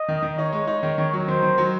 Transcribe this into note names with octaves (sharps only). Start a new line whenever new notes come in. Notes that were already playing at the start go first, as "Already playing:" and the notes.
Already playing: D#5
D#3
D#3
D#4 C#5
G#3
D#4
D#3
D#3
F#3
D#3 C5
D#3
F#3